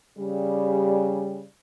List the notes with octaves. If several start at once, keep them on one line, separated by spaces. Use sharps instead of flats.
C#3 G3